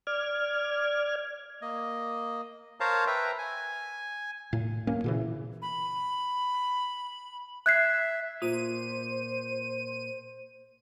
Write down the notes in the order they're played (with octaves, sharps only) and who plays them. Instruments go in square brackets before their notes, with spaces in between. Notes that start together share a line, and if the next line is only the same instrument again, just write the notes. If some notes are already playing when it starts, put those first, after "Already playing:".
[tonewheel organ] D5 F6 G#6
[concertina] A#3 D#5
A#4 C5 C#5 F5 A5 A#5
B4 E5 G5 A#5
G#5
[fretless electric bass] A2
D1 A#3 C#4
A#2 C#3 E3
[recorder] B5
[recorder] E5 [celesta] F#6 G#6 C7
[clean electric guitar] A#2 [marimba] F4 [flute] C5 [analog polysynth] D#7